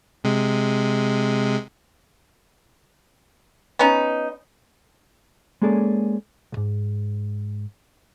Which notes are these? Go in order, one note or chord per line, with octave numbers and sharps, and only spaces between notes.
C3 G#3
B3 C#4 D#4
G#3 A#3 C#4 G#4 A4 D5
B1 G#2